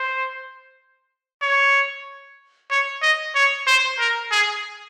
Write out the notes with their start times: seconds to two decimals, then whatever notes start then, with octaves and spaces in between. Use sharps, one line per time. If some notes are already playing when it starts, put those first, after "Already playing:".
Already playing: C5
1.42 C#5
2.71 C#5
3.02 D#5
3.35 C#5
3.67 C5
3.99 A#4
4.31 G#4